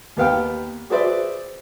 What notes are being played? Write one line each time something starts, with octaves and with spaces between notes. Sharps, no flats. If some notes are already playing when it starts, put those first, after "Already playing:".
D#2 B3 F5 G5
F#4 G#4 B4 C5 D5 E5